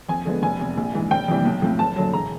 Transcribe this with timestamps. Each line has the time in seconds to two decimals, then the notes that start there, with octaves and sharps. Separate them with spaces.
0.09 F2 G#5
0.25 D3 F3 G#3 B3
0.42 F1 G#5
0.60 E2 C3
0.77 A#1
0.93 G#2 E3
1.11 F1 G5
1.28 F2 C3 E3 G3
1.45 B1
1.62 A2 F3 A3 C4
1.79 F#1 A5
1.96 F#2 D3 F#3
2.13 E1 A#5